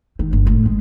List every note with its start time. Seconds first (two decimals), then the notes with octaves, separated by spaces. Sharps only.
0.19 D#3
0.33 G1
0.47 A2
0.66 G#3